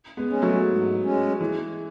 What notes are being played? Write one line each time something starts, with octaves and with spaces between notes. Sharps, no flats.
G#3 B3
G#3 C#4
F#3 A3
G#2
G#3 C#4
E3 G#3